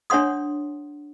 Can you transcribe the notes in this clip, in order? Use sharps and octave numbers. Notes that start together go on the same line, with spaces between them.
D4 C#5 F#5 C6 D#6